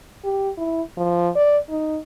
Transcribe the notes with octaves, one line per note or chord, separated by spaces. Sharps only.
G4
E4
F3
D5
D#4